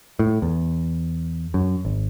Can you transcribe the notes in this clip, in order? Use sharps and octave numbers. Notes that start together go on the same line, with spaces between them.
A2
E2
F#2
G#1